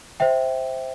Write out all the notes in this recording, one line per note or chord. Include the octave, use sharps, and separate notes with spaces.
C5 E5 G5